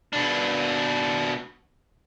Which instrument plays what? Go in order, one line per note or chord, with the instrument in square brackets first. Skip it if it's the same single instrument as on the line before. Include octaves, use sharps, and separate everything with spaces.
[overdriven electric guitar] B2 D4